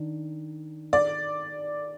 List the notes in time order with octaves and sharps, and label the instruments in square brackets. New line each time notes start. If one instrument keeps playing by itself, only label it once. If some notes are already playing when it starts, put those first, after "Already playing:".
Already playing: [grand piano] D#3 D4
[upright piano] D5